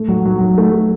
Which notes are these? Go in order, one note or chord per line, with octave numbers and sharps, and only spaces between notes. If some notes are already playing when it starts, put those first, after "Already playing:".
Already playing: A3
F#3
F#3
F#3
A3
A3